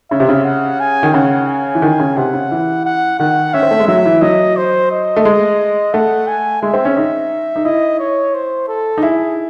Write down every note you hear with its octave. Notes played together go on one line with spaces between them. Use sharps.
C#3 E5
C3
C#3
F#5
G#5
D#3
C#3 F#5
G#5
E3
D#3
C#3
C3 F#5
C#3
E3
F#5
D#3 F#5
C#4 E5
C4
A3
G#3
F#3 E5
E3
F#3 D#5
C5
D#5
A3
G#3
A3 F#5
G#5
G#3 E5
C4
C#4
D#4
D#4
E4 D#5
C#5
C5
A4
D#4
E4 G#4